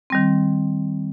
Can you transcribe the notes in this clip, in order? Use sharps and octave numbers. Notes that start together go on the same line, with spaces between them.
D#3 G3 C4